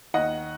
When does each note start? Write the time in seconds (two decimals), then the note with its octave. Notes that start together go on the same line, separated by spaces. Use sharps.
0.14 D#2 D#5 F#5